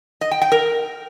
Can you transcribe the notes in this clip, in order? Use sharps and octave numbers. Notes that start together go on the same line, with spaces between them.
D#5
G5
G5
A#4